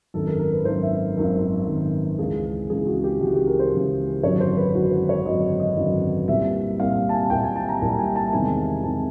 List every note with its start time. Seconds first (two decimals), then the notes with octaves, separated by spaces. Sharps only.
0.14 G#1 F#2 D#3 A4
0.27 A#4
0.39 A#4
0.53 B4
0.65 G#1 F#2 D#3 C5
0.82 E5
1.16 G#1 F#2 D#3 A#4
1.67 G#1 F#2 D#3
2.19 C#2 C#3 E3 G#4
2.70 C#2 C#3 E3 G#4
2.87 F#4
3.04 G4
3.21 C#2 C#3 E3 F#4
3.34 G4
3.47 A#4
3.60 C5
3.72 C#2 C#3 E3
4.23 G#1 F#2 D3 F#3 C#5
4.40 C5
4.57 B4
4.75 G#1 F#2 D3 F#3 F#4
4.91 C5
5.09 C#5
5.26 G#1 F#2 D3 F#3 D#5
5.43 D#5
5.60 D#5
5.77 G#1 F#2 D3 F#3
6.28 C2 A#2 G3 C4 E5
6.79 C2 A#2 G3 C4 F5
7.09 A5
7.14 G#5
7.30 C2 A#2 G3 C4 G5
7.43 G#5
7.56 A5
7.68 A#5
7.82 C2 A#2 G3 C4 A5
7.99 G#5
8.16 A5
8.33 E2 C3 D#3 G#3 C4 G#5
8.83 C3 D#3 G#3 C4 A5